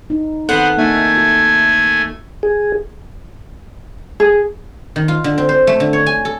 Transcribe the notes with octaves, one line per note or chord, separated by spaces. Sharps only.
D#4
D#3 B3 C4 A4 C5 F#5
A3 A#3 D#4 E5 G#5
F#4
G#4
G#4
D#3
F4
D3
C4
C5
A3
D3
C#5
G#5
A4